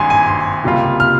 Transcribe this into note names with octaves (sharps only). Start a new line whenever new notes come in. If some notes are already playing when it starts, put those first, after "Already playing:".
Already playing: G#1 G2 G#5 C6
G#5
C6
C#2 C3 G3 A#3 F4
F6